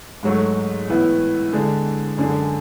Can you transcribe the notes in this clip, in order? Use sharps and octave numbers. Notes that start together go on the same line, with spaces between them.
G#2 F#3 A3
A2 E3 B3 E4
D3 G#3 D4
F#2 D3 G#3 D4